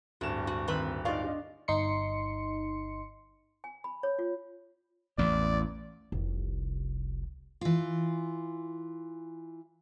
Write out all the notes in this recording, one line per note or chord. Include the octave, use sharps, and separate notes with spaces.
D1 G2 F#4 E7
F#4
D#3 C4 B4
D#4 F4 D5 F5 C#6
D4 D#5
G1 D#4 C6 C#7
G#5
B5
C#5
F4
A1 E2 D5
F1 C2
E3 F4